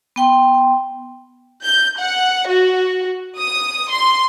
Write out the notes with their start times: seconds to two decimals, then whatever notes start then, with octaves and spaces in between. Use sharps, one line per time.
0.16 B3 G5 C6
1.64 G6
1.99 F#5
2.48 F#4
3.38 D#6
3.91 C6